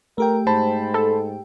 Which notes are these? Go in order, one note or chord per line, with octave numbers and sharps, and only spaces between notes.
A3 G4 A#4 G5
G#2 C5 A5 B5
A4